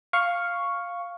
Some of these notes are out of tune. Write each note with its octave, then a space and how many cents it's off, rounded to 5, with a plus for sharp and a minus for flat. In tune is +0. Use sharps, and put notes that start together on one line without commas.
F5 +0 C#6 +0